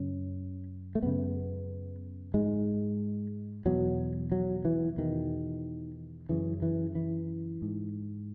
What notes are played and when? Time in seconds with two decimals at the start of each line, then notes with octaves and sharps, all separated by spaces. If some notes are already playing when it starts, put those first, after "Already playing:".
Already playing: F#2 C#3 C#4
0.95 A3
1.03 F#2 C#3 B3
2.34 G#2 G#3
3.65 E2 B2 F#3
4.32 F#3
4.65 E3
4.97 E2 B2 D#3
6.29 F#2 C#3 E3
6.62 E3
6.95 E3
7.62 G#2